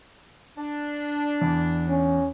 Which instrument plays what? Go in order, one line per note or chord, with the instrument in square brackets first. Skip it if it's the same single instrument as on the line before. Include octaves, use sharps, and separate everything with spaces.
[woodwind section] D4
[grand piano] E2
[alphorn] C#4